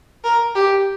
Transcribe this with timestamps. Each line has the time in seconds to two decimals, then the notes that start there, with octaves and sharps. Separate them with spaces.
0.24 A#4
0.55 G4